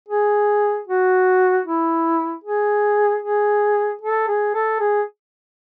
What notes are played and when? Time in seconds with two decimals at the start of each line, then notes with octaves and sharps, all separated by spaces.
0.08 G#4
0.88 F#4
1.65 E4
2.44 G#4
3.22 G#4
4.02 A4
4.28 G#4
4.54 A4
4.80 G#4